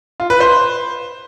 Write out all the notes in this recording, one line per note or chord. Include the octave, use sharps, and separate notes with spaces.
F4
B4
C5